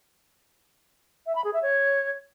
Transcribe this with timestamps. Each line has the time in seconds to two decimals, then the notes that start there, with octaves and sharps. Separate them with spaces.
1.26 E5
1.35 B5
1.44 G#4
1.53 E5
1.62 C#5